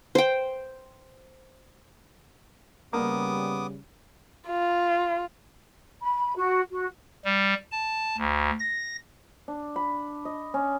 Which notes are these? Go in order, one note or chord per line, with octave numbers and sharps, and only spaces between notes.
C5 G5
C#3 G3 A#3 B3 D6 D#6
F4
B5
F#4
F#4
G3
A5
D2
A#6
D4
B5
D#5
C#4